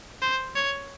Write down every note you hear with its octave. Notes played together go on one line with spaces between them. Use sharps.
C5
C#5